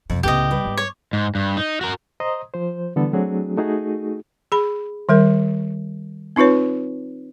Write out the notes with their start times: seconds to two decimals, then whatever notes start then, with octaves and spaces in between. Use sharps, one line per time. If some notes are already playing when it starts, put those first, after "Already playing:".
0.10 F2 C3
0.23 C#2 A2 C#3 B3 G4 D#5
0.51 G3 B4
0.65 G#2 G#3
0.77 C#5
1.13 G#2
1.35 G2
1.57 D#4
1.81 F#4 A#4
2.20 C5 D#5 A#5 C6 D#6
2.54 F3 C5
2.96 D3 E3 G3 B3 A4
3.13 F#3 A3 C4 D4 F#4 G#4
3.57 A3 D#4 F#4 G#4
4.52 G#4 B5
5.09 D#3 G3 A#4
6.36 C4 D#4 F4 B4 C#5